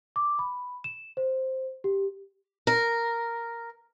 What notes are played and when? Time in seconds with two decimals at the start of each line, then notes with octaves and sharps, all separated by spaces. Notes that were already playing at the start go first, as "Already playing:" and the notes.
0.16 D6
0.39 B5
0.84 E7
1.17 C5
1.84 G4
2.67 A#4